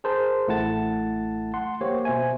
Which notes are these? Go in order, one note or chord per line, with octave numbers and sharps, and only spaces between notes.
G#4 A#4 C5 A5
A1 A3 E4 F#5 A5 A6
F#5 C6
A#3 G4 C5 C#5
B2 C5 E5 G#5